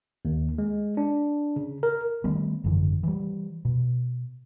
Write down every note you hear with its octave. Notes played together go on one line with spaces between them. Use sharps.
D#2
G#3
D4
C#3
A#4
D#3 G3 A3 B3
G#1 F#2 D3 E3
E3 G3
B2